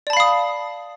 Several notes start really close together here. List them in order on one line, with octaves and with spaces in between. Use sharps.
D5 A5 B5 F5 D#6